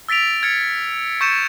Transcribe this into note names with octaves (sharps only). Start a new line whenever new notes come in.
E6 A6 B6 D7 F7
F6 G#6 A6 C#7 F7
C#6 G6 A6 C#7 D#7 E7